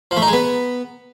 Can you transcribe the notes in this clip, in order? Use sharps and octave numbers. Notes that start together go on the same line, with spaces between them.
F3
A3
D#4
G#3
B3